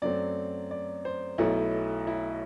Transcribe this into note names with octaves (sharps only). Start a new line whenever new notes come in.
F#2 F#3 A3 C4 D5
D5
C5
B1 B2 F#3 A3 E4
E4